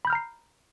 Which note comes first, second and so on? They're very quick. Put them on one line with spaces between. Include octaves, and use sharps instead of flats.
B5 G6 F6 A#5 C7